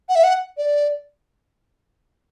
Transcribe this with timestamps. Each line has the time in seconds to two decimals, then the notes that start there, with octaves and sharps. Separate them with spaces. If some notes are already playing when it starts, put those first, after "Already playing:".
0.09 F#5
0.16 E5
0.24 F#5
0.58 D5